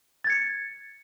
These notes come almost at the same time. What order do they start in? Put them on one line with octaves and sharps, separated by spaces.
A6 G#6 C#7